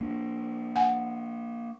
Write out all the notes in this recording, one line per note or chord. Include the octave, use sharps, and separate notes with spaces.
A#3 D4
F#5 G#5